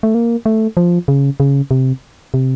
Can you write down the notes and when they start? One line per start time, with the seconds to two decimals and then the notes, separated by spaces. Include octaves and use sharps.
0.03 A3
0.15 A#3
0.46 A3
0.77 F3
1.08 C#3
1.40 C#3
1.71 C3
2.34 C3